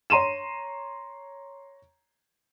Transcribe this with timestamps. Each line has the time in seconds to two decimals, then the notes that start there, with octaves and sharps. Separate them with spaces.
0.10 C#5 A#5 C6 D#7 E7